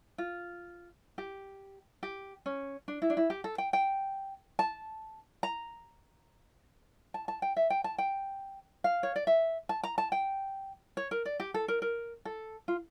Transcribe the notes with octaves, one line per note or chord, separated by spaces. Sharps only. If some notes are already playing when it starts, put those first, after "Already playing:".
F4
G4
G4
C#4
D4
E4
D4
E4
G4
A4
G5
G5
A5
A#5
A5
A5
G5
E5
G5
A5
G5
F5
C#5
D5
E5
A5
A#5
A5
G5
C#5
A#4
D5
G4
A4
A#4
A#4
A4
F4